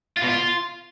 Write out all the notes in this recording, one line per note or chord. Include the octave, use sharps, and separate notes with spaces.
F4
B2
F4